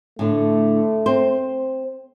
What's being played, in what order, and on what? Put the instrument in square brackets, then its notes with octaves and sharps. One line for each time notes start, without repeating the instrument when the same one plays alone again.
[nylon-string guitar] A2 D3 [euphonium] A3
[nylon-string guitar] C4 C5